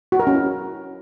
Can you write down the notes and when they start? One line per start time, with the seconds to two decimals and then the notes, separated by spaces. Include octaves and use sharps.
0.12 F#4
0.20 A#4
0.27 C#4
0.34 E4